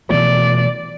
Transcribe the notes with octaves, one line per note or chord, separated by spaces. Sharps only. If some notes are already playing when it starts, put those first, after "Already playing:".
B2 E3 A3 D5